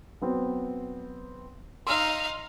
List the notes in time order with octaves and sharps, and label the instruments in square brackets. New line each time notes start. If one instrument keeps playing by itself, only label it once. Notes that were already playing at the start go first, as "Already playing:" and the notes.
[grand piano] F#3 B3 C4
[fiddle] D#4 F5 [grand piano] C6 E6 F6